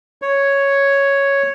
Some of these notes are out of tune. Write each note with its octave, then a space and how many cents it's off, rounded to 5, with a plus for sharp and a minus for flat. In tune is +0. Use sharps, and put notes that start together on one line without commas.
C#5 +0